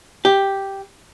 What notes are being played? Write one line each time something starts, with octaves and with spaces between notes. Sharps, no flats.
G4